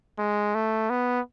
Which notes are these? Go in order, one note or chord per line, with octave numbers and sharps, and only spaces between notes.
G#3
A3
B3